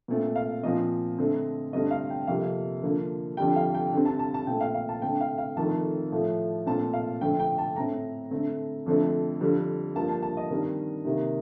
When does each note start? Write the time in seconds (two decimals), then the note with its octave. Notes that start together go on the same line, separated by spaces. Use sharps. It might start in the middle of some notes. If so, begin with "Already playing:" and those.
0.08 A#2 A3 C4
0.36 F5
0.63 A#2 F3 C4 D#5
1.18 D3 A3 C4
1.73 G2 D3 A3 C4 D#5
1.91 F5
2.10 G5
2.27 F2 C3 G3 A#3 F5
2.83 D3 F3 A#3
3.37 F2 D3 G3 G5
3.56 F5
3.75 G5
3.92 D3 G3 C4
4.06 A5
4.19 A5
4.34 A5
4.47 A#2 A3 C4 G5
4.61 F5
4.74 F5
4.89 A5
5.02 D3 A3 C4 G5
5.21 F5
5.38 F5
5.57 F2 D#3 A3 A5
6.12 A2 F3 A3
6.66 A#2 A3 C4 A5
6.94 F5
7.21 F2 D3 A3 C4 G5
7.40 G5
7.58 A5
7.76 A2 A3 C4 A#5
8.31 D3 A3 C4
8.86 F2 D3 A3 C4
9.40 F2 D3 G3 C4
9.95 G2 F3 A#3 A5
10.09 A5
10.23 A5
10.37 D#5
10.50 G2 D#3 G3 C4
11.05 C3 D#3 A#3